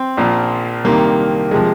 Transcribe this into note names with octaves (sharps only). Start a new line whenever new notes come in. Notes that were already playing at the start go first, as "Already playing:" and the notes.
Already playing: C4
A#1 A#2 F3
C2 C3 D#3 A#3
C3 F3 G#3